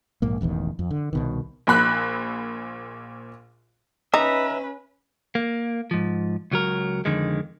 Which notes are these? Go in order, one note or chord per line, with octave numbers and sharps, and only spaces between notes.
A#1 G#2 A#3
E1 A1 E2 D#3
F2
D3
C2 B2 D#3
A#1 A#2 B5 F#6
C#4 D#4 B4 E5 A#5
A#3
G#2 F3
C#2 F#3 A#4
F2 D3 D#3 G#3